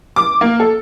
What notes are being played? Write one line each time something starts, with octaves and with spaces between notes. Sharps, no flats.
D6
A#3
A4